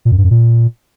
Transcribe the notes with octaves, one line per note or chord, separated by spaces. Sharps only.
A#2
F#2
G2
F#2
A#2